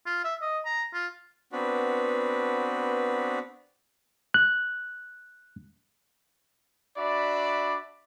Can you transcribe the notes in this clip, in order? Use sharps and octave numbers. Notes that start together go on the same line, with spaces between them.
F4
E5
D#5
A#5
F4
B3 C4 D4 F#4 B4
F#6
D4 F#4 D5 E5 B5